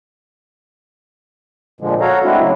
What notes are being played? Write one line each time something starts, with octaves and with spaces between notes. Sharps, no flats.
A#2 D3 F3 G#3
F#4 A4 C#5 F5 A#5
G#3 A3 C4 D4 E4 F#4
C#3 F#3 E4